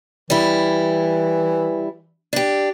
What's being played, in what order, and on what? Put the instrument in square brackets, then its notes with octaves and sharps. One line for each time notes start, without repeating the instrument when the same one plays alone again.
[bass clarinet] E3 [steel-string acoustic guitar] G3 E4
[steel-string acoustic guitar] D4 G4